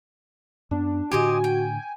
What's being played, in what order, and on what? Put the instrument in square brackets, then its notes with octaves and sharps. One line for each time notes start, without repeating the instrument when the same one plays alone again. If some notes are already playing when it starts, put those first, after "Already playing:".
[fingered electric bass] F#2 B3 [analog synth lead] D4
[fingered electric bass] A2 D3 D4 [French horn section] F#4 [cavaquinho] G4 C5 D#5 [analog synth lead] G#5
[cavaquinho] G5